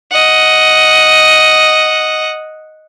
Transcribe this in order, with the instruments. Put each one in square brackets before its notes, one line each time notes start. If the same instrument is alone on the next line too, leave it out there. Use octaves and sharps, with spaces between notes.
[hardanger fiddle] D#5 F#5